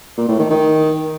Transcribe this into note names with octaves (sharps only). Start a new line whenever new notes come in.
A#2
A2
D#3
D#3